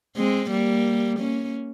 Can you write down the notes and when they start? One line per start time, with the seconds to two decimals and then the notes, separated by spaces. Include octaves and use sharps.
0.16 G#3 C4
0.50 G3 A#3
1.19 A#3 C#4